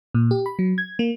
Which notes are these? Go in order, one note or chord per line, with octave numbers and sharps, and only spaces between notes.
A#2
G4
B5
F#3
G#6
A#3